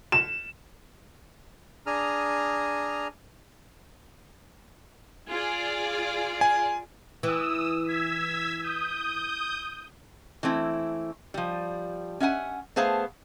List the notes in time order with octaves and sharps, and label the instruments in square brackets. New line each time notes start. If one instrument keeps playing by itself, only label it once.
[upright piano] E7
[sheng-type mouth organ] D4 G#4 A#5 D#6 F6
[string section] F4 G#4 D5
[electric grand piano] G#5
[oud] E3 [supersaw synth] D#6 E6
[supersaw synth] E6 G#6 B6
D#6 G6
[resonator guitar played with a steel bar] E3 A3 C4 E4
F3 G3
C#4 E5 F#5 G#5
A3 B3 G#4 C5 F5 A5